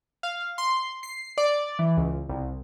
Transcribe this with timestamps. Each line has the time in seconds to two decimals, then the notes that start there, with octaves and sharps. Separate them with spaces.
0.23 F5
0.58 C6
1.03 C7
1.38 D5
1.79 E3
1.97 C#2
2.29 C2